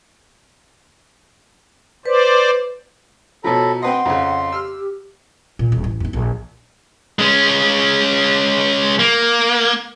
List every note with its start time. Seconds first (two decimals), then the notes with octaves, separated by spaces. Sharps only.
2.06 B4 C5 D5
3.44 B2 F3 A4 C#5 A#5 B5
3.82 C4 B4 D#5 F#5 C6
4.05 F2 C#3
4.52 G4 E6 F6
5.59 A#2
5.72 D#1
5.84 A1
6.00 D#2 D#4
6.13 A#1
7.19 G#3 C#4
8.99 A#3